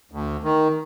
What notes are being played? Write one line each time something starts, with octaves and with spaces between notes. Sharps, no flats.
D2
D#3